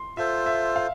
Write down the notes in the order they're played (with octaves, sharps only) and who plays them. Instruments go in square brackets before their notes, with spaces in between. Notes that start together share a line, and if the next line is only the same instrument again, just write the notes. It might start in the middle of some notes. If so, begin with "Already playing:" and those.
Already playing: [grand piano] C6
[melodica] F4 A4 C5 [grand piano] E5
[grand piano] E5
F5